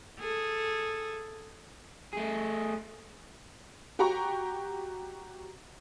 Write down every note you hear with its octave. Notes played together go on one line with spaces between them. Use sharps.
G#4 A4
A3 G#4
F#4 G4 G5 A#5 C#6